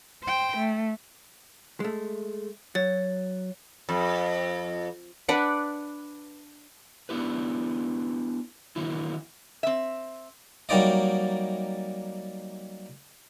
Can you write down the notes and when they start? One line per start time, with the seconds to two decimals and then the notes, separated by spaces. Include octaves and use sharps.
0.23 C5 G5
0.57 A3
1.80 G#3 A3
2.75 F#3 C#5 A6
3.89 F2
5.29 D4 B4 D5 F#5
7.09 B3 D4 E4 G4 B4
8.76 D#3 E3 F#3 A#3 E4
9.63 C4 E5
10.69 F#3 G3 A#3 D#4 D5 D#5